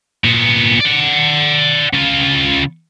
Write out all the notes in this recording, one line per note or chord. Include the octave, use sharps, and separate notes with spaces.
A#2 B3
D5 F#5
C#3 F4